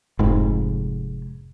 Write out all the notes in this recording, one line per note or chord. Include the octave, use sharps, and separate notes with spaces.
F1 G#2